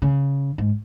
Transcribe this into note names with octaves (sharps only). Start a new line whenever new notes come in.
C#3
G#2